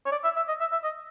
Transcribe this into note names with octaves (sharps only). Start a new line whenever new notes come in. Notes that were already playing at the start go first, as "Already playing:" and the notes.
C#5
D5
E5
E5
D#5
E5
E5
D#5